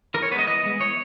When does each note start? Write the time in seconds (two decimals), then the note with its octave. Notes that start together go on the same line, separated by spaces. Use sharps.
0.14 E3 A#4
0.22 C#5
0.32 B3 B4
0.35 G#3 D#5
0.47 E3 D#5
0.63 G#3 B3
0.80 E3 C#5